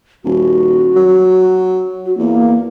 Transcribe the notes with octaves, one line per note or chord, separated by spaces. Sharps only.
D#1 F#4
F#3
F#4
E2 A#3